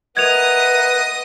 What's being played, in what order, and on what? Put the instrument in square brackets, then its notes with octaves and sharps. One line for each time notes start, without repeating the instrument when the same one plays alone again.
[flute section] A#4 B4 E5 [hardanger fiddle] D#5 D#6 [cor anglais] F#5 [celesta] G#6 F7